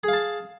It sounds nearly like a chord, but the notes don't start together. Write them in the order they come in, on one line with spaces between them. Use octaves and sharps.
G#4 F5 A5